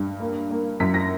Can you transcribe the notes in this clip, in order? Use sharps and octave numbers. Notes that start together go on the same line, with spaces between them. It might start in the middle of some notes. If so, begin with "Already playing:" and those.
Already playing: G2
A#3
A#3
F#2 B6
A#6